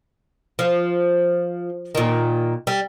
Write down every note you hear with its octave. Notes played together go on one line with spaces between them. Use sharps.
F3
A#2 D#3
G3